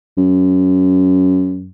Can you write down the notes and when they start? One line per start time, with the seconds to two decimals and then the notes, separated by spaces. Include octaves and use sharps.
0.17 F#2